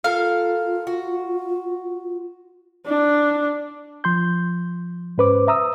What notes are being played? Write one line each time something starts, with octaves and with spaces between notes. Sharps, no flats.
F4 A4 A#4 F5
F#4
D4
F3 C6 G6
G#2 C#4 B4 C5 D6
E5 A#5 D#6 E6